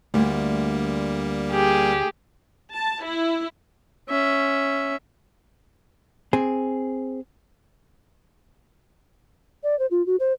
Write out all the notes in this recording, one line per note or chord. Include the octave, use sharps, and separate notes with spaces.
D2 G3 A#3
G4 G#4
A5
E4
C#4 E5
C4 G#4
D5
C5
F4
F#4
C5